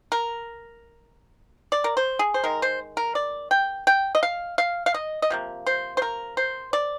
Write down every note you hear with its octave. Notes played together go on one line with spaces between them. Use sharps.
A#4
D5
A#4
C5
G#4
C5
D#3 G#3 A#4
C5
A#4
D5
G5
G5
D#5
F5
F5
F5
D#5
D#5
C3 F3 A#3
C5
C5
A#4
C5
D5